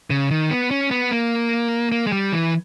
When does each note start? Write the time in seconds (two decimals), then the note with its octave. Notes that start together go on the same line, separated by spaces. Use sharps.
0.10 C#3
0.31 D#3
0.51 B3
0.71 C#4
0.91 B3
1.11 A#3
1.92 A#3
2.07 G#3
2.12 G3
2.32 E3